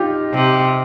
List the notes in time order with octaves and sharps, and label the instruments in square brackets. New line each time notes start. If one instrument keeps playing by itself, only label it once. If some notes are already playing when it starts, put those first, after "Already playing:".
Already playing: [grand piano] D4 D#4 F4 G4
[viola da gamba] C3